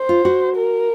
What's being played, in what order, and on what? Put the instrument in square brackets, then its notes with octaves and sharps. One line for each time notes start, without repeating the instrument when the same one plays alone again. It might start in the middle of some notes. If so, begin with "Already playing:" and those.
Already playing: [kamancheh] C5
[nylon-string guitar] F4
F#4
[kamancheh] A#4